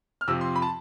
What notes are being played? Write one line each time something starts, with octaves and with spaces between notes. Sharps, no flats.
F6
F2 C3 F3 E6
C6
B5
A5